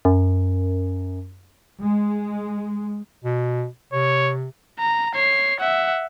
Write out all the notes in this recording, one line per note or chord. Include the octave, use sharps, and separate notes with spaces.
F#2
G#3
B2
C3 C#5
A#5
C#5 C7
E5 F#5